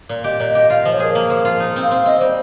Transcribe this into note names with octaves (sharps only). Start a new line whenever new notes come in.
A#2
G4 D#5
A#2
D#5
G4
F4 F5
F3 D#5
C#5
G#4 A#4
A#3
F3
F4
D#4
C4
F5
C4
C4 D#5
G3 C5